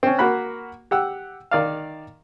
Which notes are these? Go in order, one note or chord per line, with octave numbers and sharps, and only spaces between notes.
C4 C#4
A#3 F#4 A#4 B5 F#6
G4 F#5 E6
D#3 D5 F5